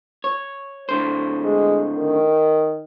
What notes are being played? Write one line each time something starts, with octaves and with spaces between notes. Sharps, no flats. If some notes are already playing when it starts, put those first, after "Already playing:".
C#5
A2 D3 C5
G#3
D#3